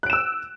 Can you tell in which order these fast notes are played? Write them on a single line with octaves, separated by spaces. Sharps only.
F#6 D7 E7 E6